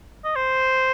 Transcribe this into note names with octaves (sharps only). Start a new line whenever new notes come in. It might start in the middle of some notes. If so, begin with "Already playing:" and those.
D#5
C5